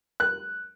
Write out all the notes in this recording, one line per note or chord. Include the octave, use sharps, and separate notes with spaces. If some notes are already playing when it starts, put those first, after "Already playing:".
F#6